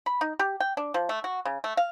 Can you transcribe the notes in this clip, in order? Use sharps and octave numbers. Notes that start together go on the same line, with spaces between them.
B5
D#4
G4
G5
D4
F3
A3
F#4
C#3
A3
F5